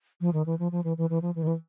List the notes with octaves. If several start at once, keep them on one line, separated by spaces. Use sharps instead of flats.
F3
D#3
E3
F3
F3
E3
E3
E3
F3
E3
D#3
E3